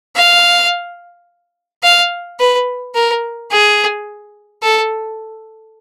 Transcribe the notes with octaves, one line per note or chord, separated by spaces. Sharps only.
F5
F5
B4
A#4
G#4
A4